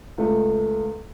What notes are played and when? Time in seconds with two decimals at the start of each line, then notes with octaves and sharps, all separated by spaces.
0.18 C#2 A3